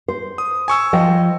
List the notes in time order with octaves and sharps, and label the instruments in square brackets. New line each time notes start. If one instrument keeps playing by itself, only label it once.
[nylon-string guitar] C5
[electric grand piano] D#6
G#5 C#6 E6
[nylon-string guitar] F3 D#5 G5